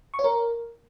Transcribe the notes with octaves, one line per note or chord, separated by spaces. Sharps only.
C#6
C#5
A#4